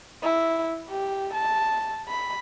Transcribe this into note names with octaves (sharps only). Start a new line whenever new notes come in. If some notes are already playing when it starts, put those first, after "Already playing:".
E4
G4
A5
B5